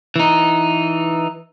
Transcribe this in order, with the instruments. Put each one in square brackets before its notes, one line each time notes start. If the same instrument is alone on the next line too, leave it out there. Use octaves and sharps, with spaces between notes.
[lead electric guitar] E3 D#4